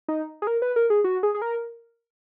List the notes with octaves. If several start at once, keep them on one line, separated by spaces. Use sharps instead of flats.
D#4
G#4
A#4
B4
A#4
G#4
F#4
G#4
G#4
A#4